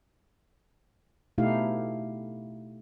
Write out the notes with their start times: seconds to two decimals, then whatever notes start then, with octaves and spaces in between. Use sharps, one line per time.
1.38 B2 A3 D#4 E4 G4 F5